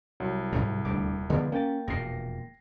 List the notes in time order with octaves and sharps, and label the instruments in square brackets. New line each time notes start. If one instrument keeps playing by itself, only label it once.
[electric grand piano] C2 [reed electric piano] F#3
[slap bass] G#2 C3 G3
[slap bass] D#1 G3 [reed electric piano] D2 D3 D6
[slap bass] D3 F3 [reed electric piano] G#3 B3 D5
[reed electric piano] A#3 G5 A6 [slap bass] C#4
[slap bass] E1 F2 A#2 [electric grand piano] A#6 C7